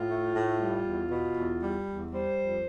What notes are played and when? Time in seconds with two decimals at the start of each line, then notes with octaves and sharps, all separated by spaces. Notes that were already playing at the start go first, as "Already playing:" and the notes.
Already playing: A2 F4
0.10 A3
0.36 A2
0.60 G3
0.86 E2
1.11 B2
1.36 E2
1.61 G3
1.86 E2
2.12 G3 C5
2.37 F2